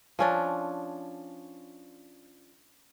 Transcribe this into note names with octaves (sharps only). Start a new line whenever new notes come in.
F3 C#4 D4